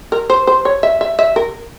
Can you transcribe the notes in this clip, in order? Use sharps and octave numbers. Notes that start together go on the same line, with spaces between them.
A#4
C5
C5
C#5
E5
E5
E5
A#4